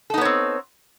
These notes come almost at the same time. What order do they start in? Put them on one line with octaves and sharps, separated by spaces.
A4 D#4 B3 C#5 C4